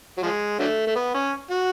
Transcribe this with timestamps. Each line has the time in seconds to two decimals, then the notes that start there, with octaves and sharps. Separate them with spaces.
0.18 F#3
0.23 F3 G#3
0.59 D3 F#3 A3
0.87 A3
0.96 B3
1.14 C#4
1.51 F#4